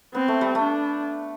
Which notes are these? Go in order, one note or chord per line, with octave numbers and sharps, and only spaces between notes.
B3 C4
A3
G3
A3
D4